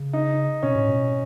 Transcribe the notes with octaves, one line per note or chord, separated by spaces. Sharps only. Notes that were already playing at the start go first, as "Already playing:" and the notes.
Already playing: C#3
D#4
B2 C#4
A2
B2